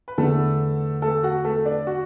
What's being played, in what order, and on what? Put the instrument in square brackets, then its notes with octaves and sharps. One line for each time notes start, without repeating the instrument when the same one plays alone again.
[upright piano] B4
[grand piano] E2 D3 B3 E4 [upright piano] A3 A4
[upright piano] A3 A4
F#4 F#5
A3 A4
D4 D5
F#4